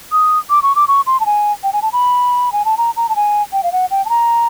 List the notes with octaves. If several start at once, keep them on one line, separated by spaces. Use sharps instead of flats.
D#6
D6
C#6
D6
C#6
C6
A5
G#5
G5
G#5
A5
B5
G#5
A5
A#5
A#5
A5
G#5
G5
F5
F#5
G5
A5
A#5